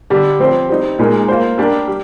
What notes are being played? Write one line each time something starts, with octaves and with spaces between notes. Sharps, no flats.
D3 G3 D4 G4
F3 C4 G4 C5
G3 C4 D#4
A#2 G#3 D#4 A#4
A#3 F4 C5
G3 D4 G4 A#4
G3